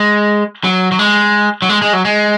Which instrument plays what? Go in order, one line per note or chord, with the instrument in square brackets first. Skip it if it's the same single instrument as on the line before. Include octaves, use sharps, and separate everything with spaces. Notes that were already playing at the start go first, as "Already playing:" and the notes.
Already playing: [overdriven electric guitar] G#3
F#3
F#3
G#3
F#3
G#3
G#3
F#3
G#3